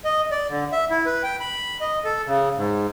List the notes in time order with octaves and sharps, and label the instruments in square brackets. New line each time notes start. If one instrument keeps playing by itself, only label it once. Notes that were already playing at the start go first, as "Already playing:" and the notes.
[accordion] D#5
D5
D3
E5
E4
B4
G5
B5
D#5
A4
C#3
G#2